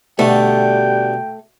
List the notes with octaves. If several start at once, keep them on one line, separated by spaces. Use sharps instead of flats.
B2 D3 G3 A3 G5